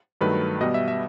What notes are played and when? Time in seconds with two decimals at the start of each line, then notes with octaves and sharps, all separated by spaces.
0.21 G2 D#3 F#3 A3 B4
0.61 B2 G3 B3 D#5
0.74 E5
0.88 E5